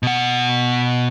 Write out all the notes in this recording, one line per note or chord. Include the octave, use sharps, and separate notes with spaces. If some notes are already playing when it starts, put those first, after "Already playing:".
B2 F#5